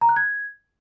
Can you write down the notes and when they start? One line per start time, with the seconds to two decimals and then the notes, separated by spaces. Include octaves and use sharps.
0.01 A#5
0.09 F#6
0.16 G#6